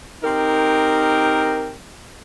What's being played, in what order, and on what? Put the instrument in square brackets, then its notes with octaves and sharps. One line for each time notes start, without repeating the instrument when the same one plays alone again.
[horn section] C4 D#4 G4 A#4